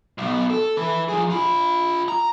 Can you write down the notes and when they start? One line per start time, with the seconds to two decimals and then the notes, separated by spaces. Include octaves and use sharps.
0.18 B1 B2
0.50 A4
0.77 E3 B4
1.08 F3 G#4
1.30 F4 B5
2.08 A#5